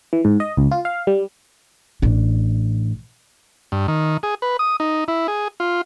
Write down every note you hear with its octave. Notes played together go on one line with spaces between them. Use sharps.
E3
G#2
D#5
C#2
F4
F5
G3
A1 D4
G2
D#3
G#4
B4
D#6
D#4
E4
G#4
F4